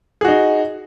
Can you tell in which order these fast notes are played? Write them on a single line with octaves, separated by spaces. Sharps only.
G#4 F#4 D#4